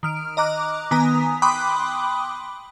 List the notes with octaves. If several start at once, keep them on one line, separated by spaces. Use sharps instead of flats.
D#3 F6 D7
D#5 A#5 D6 F#6
D#3 B3 G#5 A#5 D#6 B6
G5 B5 C6 D6 D#6 F#6